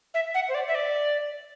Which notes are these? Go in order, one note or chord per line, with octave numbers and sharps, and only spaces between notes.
E5
F#5
C5
D5
E5
D5